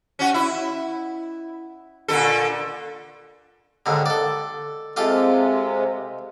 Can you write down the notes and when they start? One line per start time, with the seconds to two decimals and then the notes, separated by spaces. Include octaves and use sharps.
0.19 C#4 F#4
0.34 E4
2.08 A#2 D3 A4
3.86 D#2 G#2 D3
4.06 A4 D5
4.97 C3 G#3 F4 G4 A4